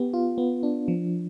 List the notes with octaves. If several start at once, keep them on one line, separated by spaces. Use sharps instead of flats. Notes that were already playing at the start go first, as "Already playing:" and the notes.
Already playing: B3 G4
F4
B3
D4
F3